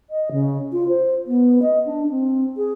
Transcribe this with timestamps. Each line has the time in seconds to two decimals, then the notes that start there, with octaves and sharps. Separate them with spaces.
0.10 D#5
0.31 C#3
0.72 F4
0.88 C5
1.27 B3
1.62 D#5
1.86 D4
2.10 C4
2.57 G#4